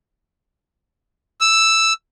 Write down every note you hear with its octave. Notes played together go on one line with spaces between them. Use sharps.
E6